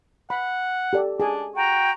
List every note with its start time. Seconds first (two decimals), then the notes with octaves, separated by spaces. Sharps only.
0.30 F#5 B5
0.93 G4 A4 D5
1.20 D4 G#4 G#5
1.56 F#4 G5 A#5